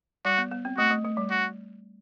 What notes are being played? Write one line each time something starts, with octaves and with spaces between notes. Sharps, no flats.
G3 F#4
B3
B3
C4
A3 F#4
A3
A3
G3
F#4